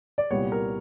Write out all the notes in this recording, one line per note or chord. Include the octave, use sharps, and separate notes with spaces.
D5
C2 A#2 G3 B3 C#5
A#4